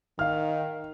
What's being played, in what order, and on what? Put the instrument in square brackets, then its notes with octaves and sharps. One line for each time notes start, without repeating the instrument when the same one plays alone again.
[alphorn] D#3 [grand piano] F5 F6